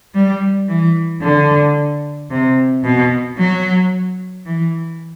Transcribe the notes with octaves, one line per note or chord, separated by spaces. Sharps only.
G3
E3
D3
C3
B2
F#3
E3